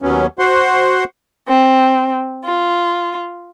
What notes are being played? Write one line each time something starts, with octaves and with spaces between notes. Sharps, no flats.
D#2 F#3 B3 C#4
F#4 C5 F#5 C6
C4
F4